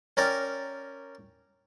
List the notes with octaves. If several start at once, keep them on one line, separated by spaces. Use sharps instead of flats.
C#4 A#4 D5 G5